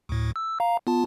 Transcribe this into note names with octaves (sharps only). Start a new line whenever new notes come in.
D2 A2
E6
F5 A#5
B3 F4 A5